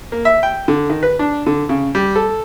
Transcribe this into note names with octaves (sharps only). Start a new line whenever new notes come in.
A#3
E5
G5
D3
D#3
B4
D4
D3
C#3
G3
A4